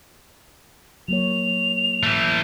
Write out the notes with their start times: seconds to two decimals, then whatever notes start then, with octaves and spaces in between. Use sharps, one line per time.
1.08 F#3 A#3 C#5 F7
2.03 E3 A3